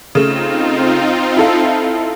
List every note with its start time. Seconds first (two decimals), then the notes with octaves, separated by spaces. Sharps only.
0.15 C#3 A3 C4 D#4 F4
1.37 E4 A4 F5